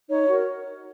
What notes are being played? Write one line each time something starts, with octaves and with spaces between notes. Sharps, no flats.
D#4 C#5
F#4 A#4